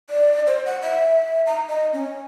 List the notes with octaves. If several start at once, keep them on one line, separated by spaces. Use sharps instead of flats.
D5
C5
F#5
E5
A#5
D#5
C#4